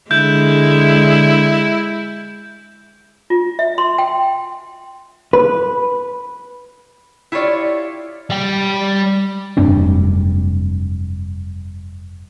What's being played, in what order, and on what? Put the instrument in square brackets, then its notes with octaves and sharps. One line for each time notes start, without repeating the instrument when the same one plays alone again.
[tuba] D3 [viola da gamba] G#3 [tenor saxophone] E4 [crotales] G6
[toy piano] F4
E5
C6
G5
[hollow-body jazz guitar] B4
[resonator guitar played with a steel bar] E4 F4 G4 C#5 D5
[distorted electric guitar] G3 G5
[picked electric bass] F1 G2 C4 D4